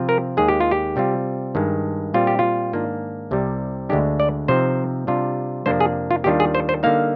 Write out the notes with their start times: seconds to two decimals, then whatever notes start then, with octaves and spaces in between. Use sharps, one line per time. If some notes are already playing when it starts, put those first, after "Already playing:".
Already playing: C3 F3 C4 F4
0.09 A#4
0.37 D#2 D#3 G#3 G#4
0.48 G4
0.61 F4
0.71 G4
0.96 C3 G3 C4 F4
1.55 G2 D#3 G#3
2.14 A#2 G3 C4 F4
2.27 G4
2.39 F4
2.73 G#2 D#3 A#3 D4
3.31 C2 C3 G3
3.89 D2 D3 G#3 D4 G4
4.20 D5
4.48 C3 F3 C4 D#4 C5
5.07 C3 G3 D4 F4
5.66 F2 C3 F3 A#3 D4 C5
5.80 G#4
6.11 F4
6.24 D#2 D#3 G3 D4 F4 G4
6.40 G#4
6.55 C5
6.69 C5
6.83 D3 G3 A#3 D#4 F5